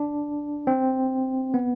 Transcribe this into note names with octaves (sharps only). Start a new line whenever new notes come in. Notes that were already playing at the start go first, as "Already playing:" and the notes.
Already playing: D4
C4
B3